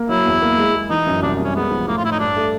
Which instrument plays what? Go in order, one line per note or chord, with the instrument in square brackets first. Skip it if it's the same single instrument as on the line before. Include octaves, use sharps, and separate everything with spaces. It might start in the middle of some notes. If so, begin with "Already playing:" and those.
Already playing: [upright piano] A#3
[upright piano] F#3 [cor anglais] E4
[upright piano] E2
A#3
G#3
G#3
[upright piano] E3 [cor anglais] D#4
[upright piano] F#2
[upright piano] C2 [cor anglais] D4
[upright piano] C2
[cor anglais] C#4
[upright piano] G#3 [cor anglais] B3
[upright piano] F3
[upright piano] A2 [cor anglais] A#3
[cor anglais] F4
[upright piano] A2 [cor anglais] E4
[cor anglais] D#4
[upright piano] G2 [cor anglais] D4
[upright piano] A3